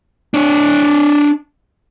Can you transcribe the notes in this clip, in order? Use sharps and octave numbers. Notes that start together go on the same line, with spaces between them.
D4 C#5